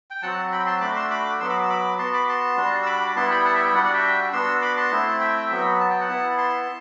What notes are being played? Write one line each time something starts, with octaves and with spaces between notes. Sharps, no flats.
G5
F#3 C4 F#4 F#5 A5
G5 B5
A5 C6
A3 D4 F#4 B5 D6
C6 E6
B5 D6
F#3 B3 F#4 C6 E6
B5 D6
E6
B5 D6
B3 F#4 A5 C6
B5 D6
A5 C6
G3 D4 F#4
E6
B5 D6
G3 B3 E4 A5 C6
G5 B5
F#5 A5
E5 G5
E5 G5
G3 D4 F#4 D5 F#5
D5 F#5
E5 G5
B3 D4 F#4 C6 E6
B5 D6
A5 C6
A3 C4 E4
E5 G5
F#3 B3 F#4
A5
G5
F#5 A5
B3 E4
A5 C6